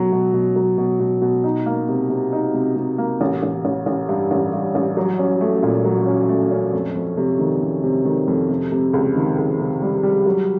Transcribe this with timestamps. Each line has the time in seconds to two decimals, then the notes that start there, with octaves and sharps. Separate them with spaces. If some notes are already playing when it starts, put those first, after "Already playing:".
Already playing: B2 F#3
0.12 B2
0.33 B2
0.56 F#3
0.78 B2
1.00 B2
1.22 B2
1.44 D#4
1.66 A#3
1.89 C3
2.10 C3
2.33 D#4
2.54 C3
2.76 C3
2.98 A#3
3.21 A1
3.43 A1
3.65 A1
3.86 A1
4.09 G2
4.31 A1
4.53 G2
4.75 A1
4.97 F#3
5.19 C#4
5.41 A3
5.63 A#2
5.85 F#3
6.07 C#4
6.29 A3
6.51 C#4
6.73 F2
6.95 F2
7.17 C3
7.39 D#3
7.61 C3
7.84 C3
8.05 D#3
8.28 F2
8.49 C3
8.72 C3
8.94 C#2
9.15 D#3
9.38 C#2
9.59 C3
9.82 G3
10.03 G3
10.26 F#3